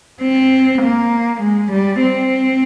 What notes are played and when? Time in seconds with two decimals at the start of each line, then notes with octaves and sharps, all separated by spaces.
0.22 C4
0.82 A#3
1.41 G#3
1.72 G3
2.01 C4